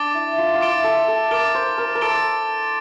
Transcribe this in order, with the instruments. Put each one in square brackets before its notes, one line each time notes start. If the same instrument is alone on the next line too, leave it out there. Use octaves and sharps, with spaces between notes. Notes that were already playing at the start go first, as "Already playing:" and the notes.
Already playing: [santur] D4 [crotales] D6 A6 D7 G7
[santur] E4
F4
F4
[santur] E4 [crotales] D6 A6 D7 G7
[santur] A4
A4
[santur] A#4 [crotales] D6 A6 D7 G7
[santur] C5
A#4
A#4
[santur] A4 [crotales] D6 A6 D7 G7